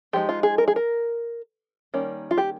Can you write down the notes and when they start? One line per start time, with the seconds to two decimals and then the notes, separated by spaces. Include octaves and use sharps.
0.13 F3 G#3 D#4 G4
0.29 F4
0.43 G#4
0.58 A#4
0.68 G#4
0.76 A#4
1.94 D#3 G3 A#3 C#4
2.31 F4
2.38 G4